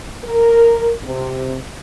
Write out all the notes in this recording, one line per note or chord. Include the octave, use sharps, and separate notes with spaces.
A#4
C3